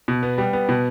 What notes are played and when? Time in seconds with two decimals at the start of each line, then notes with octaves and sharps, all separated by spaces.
0.08 B2
0.23 B3
0.38 G3
0.53 B3
0.69 B2